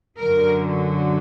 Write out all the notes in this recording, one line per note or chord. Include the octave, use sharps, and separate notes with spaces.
F#2 D3 F#3 A#4